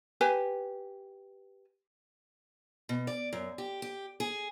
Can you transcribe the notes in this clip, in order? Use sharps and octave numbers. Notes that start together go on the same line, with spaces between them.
G4 B4 G#5
B2
D5
F#2
G4
G4
G#4